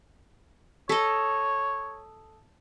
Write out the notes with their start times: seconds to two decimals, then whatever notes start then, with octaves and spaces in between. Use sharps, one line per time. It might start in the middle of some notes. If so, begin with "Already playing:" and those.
0.89 A4 C#5 D#5